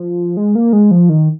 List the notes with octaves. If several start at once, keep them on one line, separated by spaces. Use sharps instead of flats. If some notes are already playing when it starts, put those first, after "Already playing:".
Already playing: F3
G#3
A#3
G#3
F3
D#3